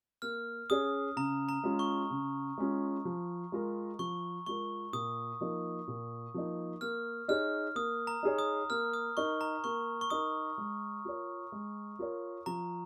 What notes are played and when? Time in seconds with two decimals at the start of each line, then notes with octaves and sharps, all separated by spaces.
0.22 A#3 F6
0.70 C#4 G#4 C#5 D#6
1.16 C#3 A#5
1.49 A#5
1.64 G#3 C#4 F4
1.79 C#6
2.10 C#3
2.58 G#3 C#4 F4
3.05 F3
3.52 G#3 F4 A#4
3.99 F3 C#6
4.46 G#3 F4 A#4 C#6
4.93 A#2 D#6
5.41 F3 A#3 D#4
5.88 A#2
6.34 F3 A#3 D#4
6.81 A#3 F6
7.28 D#4 G#4 C#5 F6
7.76 A#3 D#6
8.07 A#5
8.23 D#4 G#4 C#5
8.39 D#6
8.70 A#3 F6
8.94 D#6
9.17 D#4 A#4 C#6
9.41 A#5
9.64 A#3 C#6
10.01 C#6
10.10 D#4 A#4 D#6
10.58 G#3
11.05 F4 A#4 C#5
11.52 G#3
11.99 F4 A#4 C#5
12.46 F3 A#5